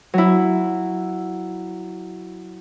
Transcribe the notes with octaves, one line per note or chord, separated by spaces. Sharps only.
F#3 E4